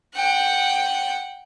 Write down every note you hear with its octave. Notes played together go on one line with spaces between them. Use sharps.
F#5 G5